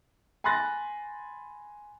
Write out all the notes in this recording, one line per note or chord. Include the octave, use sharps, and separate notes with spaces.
G#5 B5 C6 F#6 A6 A#6